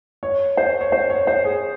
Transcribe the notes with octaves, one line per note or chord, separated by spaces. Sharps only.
C#5
C5
C#5
C5
C#5
C5
G#4